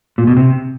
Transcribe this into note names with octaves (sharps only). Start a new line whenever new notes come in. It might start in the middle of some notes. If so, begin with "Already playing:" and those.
A#2
B2
C3